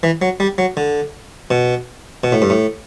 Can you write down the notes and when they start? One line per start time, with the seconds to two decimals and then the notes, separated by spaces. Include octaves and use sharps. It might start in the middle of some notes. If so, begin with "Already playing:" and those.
0.03 E3
0.22 F#3
0.40 G3
0.58 F#3
0.77 D3
1.51 B2
2.24 B2
2.32 A2
2.42 G2
2.50 A2